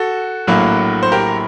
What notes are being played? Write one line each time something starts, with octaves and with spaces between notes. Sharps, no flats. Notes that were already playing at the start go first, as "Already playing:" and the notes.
Already playing: F#4 A4
A#1 A2 F#3 A#3
C5
G4 A#4